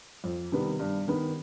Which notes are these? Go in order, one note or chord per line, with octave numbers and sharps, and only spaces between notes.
F2
C3 D#3 G3 B3
G2
D#3 B3